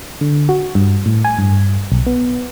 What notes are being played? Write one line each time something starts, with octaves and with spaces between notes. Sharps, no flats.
D3
F#4
G2
A2
G#5
G2
B1
B3